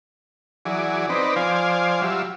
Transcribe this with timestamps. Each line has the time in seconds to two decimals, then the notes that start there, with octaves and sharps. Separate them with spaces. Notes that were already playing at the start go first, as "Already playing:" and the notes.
0.65 E3 F#3 G#4 D5
1.09 C4 D#4 B4 D5
1.36 F3 C5 D5 F5 G#5
2.02 F#3 G3 F4 E5